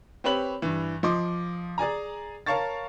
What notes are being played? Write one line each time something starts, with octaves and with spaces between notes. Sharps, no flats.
C4 G4 B4 C#5 B5 F#7
G2 E3
F3 D#5 C6 D6
G#4 D5 G#5 A#5
A#4 C#5 F5 A5 C#6 A6